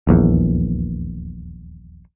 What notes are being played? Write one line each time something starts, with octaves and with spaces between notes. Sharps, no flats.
D#1 A#1 E2